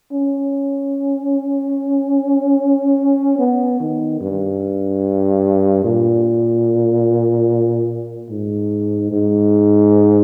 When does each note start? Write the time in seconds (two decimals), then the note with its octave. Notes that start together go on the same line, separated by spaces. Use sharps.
0.12 C#4
3.39 B3
3.80 D#3
4.21 G2
5.85 A#2
8.30 G#2
9.12 G#2